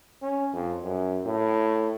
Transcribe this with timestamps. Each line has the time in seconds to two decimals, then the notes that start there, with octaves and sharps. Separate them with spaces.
0.22 C#4
0.53 F2
0.83 F#2
1.25 A2